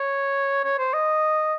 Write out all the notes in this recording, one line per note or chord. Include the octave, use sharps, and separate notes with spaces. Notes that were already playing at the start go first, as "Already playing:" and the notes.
Already playing: C#5
C#5
C5
D#5